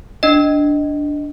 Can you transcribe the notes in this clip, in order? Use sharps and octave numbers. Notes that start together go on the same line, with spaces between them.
D4 D#5